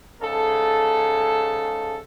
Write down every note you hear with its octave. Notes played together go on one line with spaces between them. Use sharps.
G#2 C#3 A4